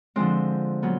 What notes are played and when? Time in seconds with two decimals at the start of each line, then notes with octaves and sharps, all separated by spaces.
0.16 D3 F3 G#3 C4 C5
0.83 A#2 F#3 B3